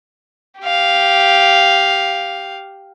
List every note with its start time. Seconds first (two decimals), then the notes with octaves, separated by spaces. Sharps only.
0.59 G4 F5